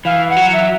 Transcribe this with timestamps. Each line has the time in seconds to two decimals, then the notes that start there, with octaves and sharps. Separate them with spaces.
0.05 E3 F5
0.29 F#5
0.37 F#3
0.53 E5